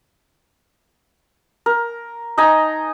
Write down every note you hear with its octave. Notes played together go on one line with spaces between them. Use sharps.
A#4
D#4 D#5 G#5 A#5